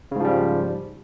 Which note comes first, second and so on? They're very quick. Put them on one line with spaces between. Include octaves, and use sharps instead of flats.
C#3 G#2 F3 G3